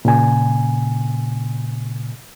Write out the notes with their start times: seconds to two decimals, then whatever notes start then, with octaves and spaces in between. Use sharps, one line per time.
0.05 A#2 C#3 G#5